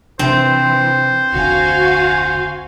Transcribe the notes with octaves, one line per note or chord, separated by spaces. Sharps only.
C3 E3 C4 D4 C5
F1 D2 D3 F#4 F5 G#5